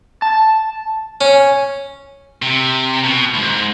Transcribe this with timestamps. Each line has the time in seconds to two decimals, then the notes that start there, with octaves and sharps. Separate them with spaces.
0.22 A5
1.21 C#4
2.42 C3
3.04 B2
3.34 D2 G#2